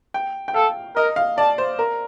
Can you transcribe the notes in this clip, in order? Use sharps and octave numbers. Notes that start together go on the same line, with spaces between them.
G5
G5
A4 F5
A#4 D#5
F5
D5 A5
C5
A#4